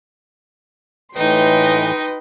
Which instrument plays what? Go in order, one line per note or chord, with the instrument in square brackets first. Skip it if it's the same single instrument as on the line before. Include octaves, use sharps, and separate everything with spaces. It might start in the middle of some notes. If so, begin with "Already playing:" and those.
[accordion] A2 E3 [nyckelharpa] D#4 [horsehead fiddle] B4 [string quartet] D#5 G5 C6